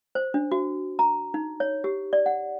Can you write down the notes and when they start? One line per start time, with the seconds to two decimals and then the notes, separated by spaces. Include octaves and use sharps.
0.15 C5
0.34 D4
0.52 F#4
0.99 A#5
1.34 D#4
1.60 C#5
1.84 G4
2.13 D5
2.26 F#5